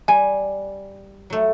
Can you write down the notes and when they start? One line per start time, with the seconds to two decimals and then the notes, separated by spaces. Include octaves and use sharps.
0.08 G3 G#5
1.30 F#3 A3